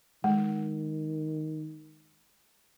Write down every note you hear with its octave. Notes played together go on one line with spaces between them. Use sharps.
D#3 G#3